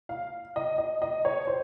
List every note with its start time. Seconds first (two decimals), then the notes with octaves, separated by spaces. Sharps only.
0.09 F5
0.56 D#5
0.78 D#5
1.02 D#5
1.25 C#5
1.47 C5